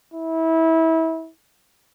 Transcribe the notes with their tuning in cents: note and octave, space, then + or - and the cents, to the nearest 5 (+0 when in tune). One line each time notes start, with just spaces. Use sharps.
E4 -25